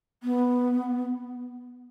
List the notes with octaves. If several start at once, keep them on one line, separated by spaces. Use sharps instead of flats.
B3